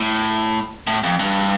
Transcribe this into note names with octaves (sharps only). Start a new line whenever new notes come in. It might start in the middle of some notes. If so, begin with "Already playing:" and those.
Already playing: A2
A2
F2
G2